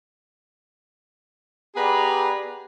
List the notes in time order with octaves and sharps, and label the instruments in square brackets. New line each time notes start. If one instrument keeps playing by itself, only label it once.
[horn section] B3 G4 G#4 B4 D5 A#5